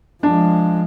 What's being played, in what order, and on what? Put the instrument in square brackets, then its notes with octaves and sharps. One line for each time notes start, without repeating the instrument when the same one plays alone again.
[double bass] F3 G#3 [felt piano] D4